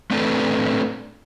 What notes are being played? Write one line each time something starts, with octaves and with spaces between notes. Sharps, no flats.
A3 C4 D4 A4 B4